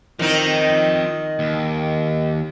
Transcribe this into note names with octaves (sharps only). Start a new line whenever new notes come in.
D#3 F3 C4 D#4
D#2